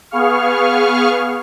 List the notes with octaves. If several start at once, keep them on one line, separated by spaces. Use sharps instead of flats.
B3 G#4 F5 C#6 F6